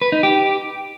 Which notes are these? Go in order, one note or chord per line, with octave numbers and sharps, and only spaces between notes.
B4
D#4
G4